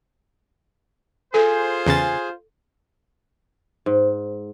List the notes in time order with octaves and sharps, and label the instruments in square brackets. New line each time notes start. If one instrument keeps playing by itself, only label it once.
[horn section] F4 C5 [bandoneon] G#4 G#5 [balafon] A4
[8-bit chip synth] E2 C#3 A6
[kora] G#2